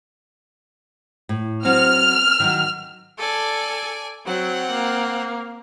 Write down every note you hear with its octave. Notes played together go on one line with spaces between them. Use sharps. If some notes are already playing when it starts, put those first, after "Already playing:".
A2
F#3 B3 C4 F6
D#3 F3 F#3
A4 D5 G#5
F#3 C4 F#5
A#3